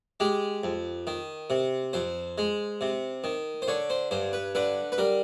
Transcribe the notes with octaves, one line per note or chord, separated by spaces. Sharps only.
G#3 G4
F2
D#3
C3
F2 C5
G#3
C3
D#3
C5
D3 C#5
C5
G2 C5
B4
D3 B4
B4
G3 A#4